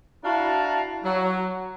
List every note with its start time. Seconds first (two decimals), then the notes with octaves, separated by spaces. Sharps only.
0.24 D4 E4 F#4 F5 A5 A#5
1.04 F#3